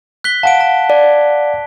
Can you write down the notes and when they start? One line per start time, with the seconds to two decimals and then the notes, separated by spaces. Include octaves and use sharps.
0.24 F#6 B6 G7
0.43 F5 F#5 A5 D7
0.61 A5
0.90 D5